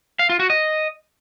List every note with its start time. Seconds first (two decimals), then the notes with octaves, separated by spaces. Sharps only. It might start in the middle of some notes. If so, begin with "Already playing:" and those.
0.19 F5
0.29 F4
0.40 F#4
0.50 D#5